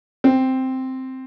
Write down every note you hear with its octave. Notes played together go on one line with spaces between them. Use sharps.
C4